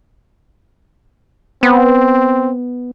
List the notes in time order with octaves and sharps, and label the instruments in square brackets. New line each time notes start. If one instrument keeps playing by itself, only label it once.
[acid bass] B3 [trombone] C4